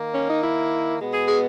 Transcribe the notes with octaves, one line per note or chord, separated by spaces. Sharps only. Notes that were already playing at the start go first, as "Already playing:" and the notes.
Already playing: D#3 A#3
C#4
D#4
E4
B2 G#3 B3
G#4
G#4